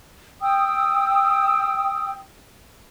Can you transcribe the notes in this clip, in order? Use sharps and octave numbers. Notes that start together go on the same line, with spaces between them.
G5 D#6 E6